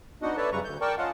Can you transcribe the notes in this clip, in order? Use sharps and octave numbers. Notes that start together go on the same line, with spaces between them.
B3 D4 D#4 F#4 D#5 F#5
A4 B4 C#5 D5 E5 A5
F#2 C#3 G3 B4 A#5 C#6
D2 G6
A#4 D5 G5 A5 C#6
C#4 F4 D#5 F5 F#5 A5